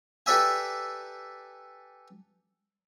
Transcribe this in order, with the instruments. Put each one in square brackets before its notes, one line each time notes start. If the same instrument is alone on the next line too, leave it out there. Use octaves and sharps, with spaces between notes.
[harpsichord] G4 A4 B4 D5 E5 G#5